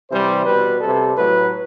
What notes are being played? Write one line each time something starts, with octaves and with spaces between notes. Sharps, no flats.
C3 E3 G3 C5
B2 G3 B4
C3 G3 A4
A2 F#3 B4